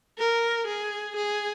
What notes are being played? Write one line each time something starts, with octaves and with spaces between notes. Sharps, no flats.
A#4
G#4
G#4